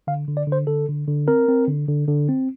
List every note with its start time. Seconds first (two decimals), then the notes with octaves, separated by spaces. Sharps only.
0.07 D3 F5
0.28 D3
0.37 D5
0.47 D3 C5
0.67 D3 A4
0.88 D3
1.08 D3
1.28 C4 A#4
1.48 C4
1.68 D3
1.88 D3
2.08 D3
2.29 C4